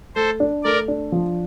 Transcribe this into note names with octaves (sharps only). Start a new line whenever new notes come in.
A3 A4 C5
D4
A3 A#4 D5
D4
F3